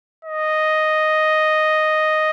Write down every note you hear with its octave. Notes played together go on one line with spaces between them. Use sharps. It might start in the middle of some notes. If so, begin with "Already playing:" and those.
D#5